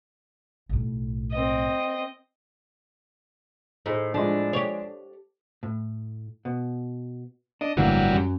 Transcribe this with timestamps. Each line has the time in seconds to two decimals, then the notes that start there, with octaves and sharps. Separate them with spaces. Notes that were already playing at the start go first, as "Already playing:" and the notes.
0.69 B1 A2
1.32 C4 D#5
3.86 A2 D#4 G#4 C5
4.14 A2 F3 G#3 D4
4.53 G4 C#5
5.63 A2
6.45 B2
7.61 D4 D#5
7.77 G1 A2 D3 E3 F#3 G3 A#3
8.13 F#2